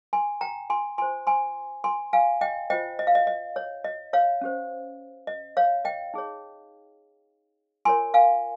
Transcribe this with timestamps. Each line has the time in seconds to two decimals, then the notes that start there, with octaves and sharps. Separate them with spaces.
0.13 G#5 C6
0.41 G5 A#5
0.70 G#5 C6
0.98 F4 C5 G#5 C6
1.27 G#5 C6
1.84 G#5 C6
2.13 F5 G#5
2.41 D#5 G5
2.70 F4 C5 D#5 G5
2.99 D#5
3.07 F5
3.15 D#5
3.27 D#5
3.56 C#5
3.84 D#5
4.13 C#5 F5
4.41 C#4 G4 C5
5.27 D#5
5.57 C#5 F5
5.85 D#5 G5
6.14 D#4 G#4 C#5
7.85 F4 A#4 C#5 G#5 C6
8.14 F5 G#5